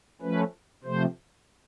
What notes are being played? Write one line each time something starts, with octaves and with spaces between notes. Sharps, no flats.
F3 A3 C#4 B4
C3 F3 A3 C5